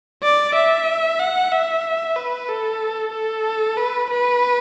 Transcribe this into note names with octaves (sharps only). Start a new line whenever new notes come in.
D5
E5
F#5
E5
B4
A4
A4
B4
B4